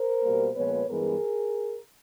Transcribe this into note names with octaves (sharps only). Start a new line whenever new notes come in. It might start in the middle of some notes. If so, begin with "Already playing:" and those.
Already playing: A#4 C5
B2 G3 A#3
A#2 F3 G#3 B3 B4 C#5
G2 E3 G#3 B3 G#4 A#4